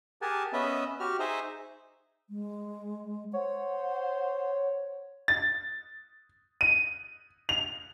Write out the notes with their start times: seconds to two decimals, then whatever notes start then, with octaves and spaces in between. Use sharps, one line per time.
0.22 G4 G#4 A#4 F#5 G#5 A5
0.53 B3 C#4 B4 D#5 E5
1.00 F#4 G4 F6
1.20 D#4 G#4 C5 D#5 E5
2.29 G#3
3.33 C5 C#5 F#5
5.28 A6
6.61 D#7
7.49 F7